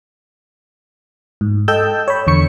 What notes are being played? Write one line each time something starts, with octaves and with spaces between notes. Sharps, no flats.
G#2
A4 D#5 G5 A5 E6 G6
C#5 B5
E2 D3 C#6 C#7